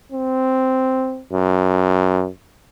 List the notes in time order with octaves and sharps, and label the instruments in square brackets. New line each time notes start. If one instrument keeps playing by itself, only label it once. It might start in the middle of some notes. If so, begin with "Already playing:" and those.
[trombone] C4
F#2